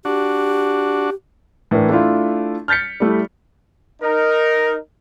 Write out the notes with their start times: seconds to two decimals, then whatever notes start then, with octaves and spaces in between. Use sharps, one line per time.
0.05 D4 F#4 G4
1.71 A2 E3 D4 A#4
1.89 A3 D4 E4 F4
2.68 F6 G6 A6 B6 C#7
3.00 G3 A3 E4
4.02 D#4 A#4